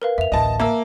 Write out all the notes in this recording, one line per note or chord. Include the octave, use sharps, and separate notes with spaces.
A#4 B4 F5
F2 E5 F7
A1 D2 D#5 A5
A#3 E5 A5 E6